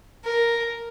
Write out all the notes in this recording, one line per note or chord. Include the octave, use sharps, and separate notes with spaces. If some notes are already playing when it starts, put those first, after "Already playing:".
A#4